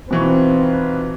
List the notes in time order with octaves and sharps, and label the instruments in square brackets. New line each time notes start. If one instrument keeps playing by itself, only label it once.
[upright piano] B2 E3 C#6 [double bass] C4 [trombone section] D#4 F4 B4